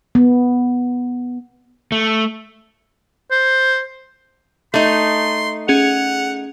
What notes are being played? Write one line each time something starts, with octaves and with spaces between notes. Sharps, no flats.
B3
A3
C5
A3 D#4 C6
C#4 G#4 F#5 F7